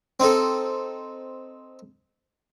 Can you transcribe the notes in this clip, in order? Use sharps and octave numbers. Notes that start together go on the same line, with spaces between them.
C4 D#4 A4